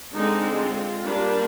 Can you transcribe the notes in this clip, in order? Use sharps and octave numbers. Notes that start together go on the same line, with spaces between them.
D3 G#3 C4 D#4
F4
G3 A#3 D4